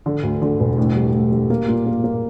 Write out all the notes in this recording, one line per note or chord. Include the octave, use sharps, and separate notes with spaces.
D3
D2
D3
E1
A2
G3
A2
G3
A#3
A#2
A#3
A#3